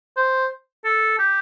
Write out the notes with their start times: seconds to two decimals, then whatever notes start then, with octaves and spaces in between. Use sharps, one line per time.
0.17 C5
0.85 A4
1.19 G4